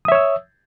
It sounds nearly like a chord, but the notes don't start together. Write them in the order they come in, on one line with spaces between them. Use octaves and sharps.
D#6 E5 C#5 E6